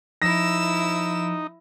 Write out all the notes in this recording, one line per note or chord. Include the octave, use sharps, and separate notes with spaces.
F3 D#4 E4 E6 A#6